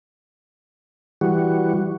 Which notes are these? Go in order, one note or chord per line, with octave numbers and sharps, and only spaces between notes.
E3 G3 F#4